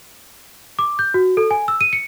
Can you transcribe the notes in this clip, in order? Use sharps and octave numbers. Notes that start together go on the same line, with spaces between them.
D6
G6
F#4
A4
G#5
E6
D#7
C#7